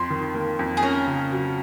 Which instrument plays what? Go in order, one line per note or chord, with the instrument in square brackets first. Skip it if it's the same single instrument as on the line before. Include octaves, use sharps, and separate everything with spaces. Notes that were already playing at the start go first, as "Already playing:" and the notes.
Already playing: [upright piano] F2 [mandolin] C6
[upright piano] D#3
A#3
F2
[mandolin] G#4
[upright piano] C#4 [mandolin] A#4
[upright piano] C#3
F#3